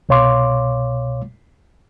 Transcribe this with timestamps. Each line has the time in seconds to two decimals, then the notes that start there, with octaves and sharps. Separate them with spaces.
0.09 C2 B2 C#5 F5 C6 D6